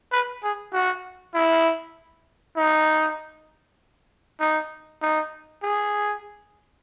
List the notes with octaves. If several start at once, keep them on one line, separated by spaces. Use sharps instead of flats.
B4
G#4
F#4
E4
D#4
D#4
D#4
G#4